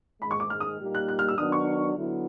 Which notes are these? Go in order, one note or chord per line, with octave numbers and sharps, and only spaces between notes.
G#2 D#3 G#3 B5
C#6
D6
F6
D#6
A#2 G3 A#3 D#4 G4
F#6
F#6
F6
E6
D#3 F#3 B3 D4 D#6
C#6
D3 F#3 B3 E4